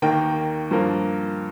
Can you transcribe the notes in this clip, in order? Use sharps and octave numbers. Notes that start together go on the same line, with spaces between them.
D#2 D#3 A#3 G5
G2 F3 A#3